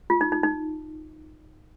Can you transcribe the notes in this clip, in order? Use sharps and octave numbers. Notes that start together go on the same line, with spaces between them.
F4
D#4
D#4
D#4